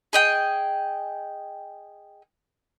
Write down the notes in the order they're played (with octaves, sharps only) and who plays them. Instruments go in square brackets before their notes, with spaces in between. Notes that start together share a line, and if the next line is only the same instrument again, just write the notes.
[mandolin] G#4 D#5 G5